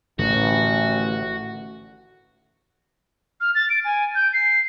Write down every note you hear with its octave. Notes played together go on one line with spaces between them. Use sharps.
A1 A2 D3 D#3 F#4
F6
A6
D7
G#5
G6
C7